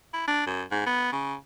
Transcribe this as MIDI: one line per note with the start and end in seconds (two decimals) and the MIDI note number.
0.13 0.27 64
0.27 0.42 62
0.46 0.62 42
0.71 0.82 44
0.86 1.11 59
1.12 1.34 49